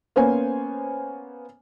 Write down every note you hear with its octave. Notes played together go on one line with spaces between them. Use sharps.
A#3 B3 C#4 C5 C#5 G#5